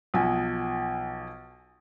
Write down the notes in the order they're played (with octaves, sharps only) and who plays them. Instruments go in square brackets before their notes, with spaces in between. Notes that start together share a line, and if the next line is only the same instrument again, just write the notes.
[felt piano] B1 F3 G#5